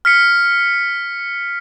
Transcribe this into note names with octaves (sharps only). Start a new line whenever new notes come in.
F6 B6 C#7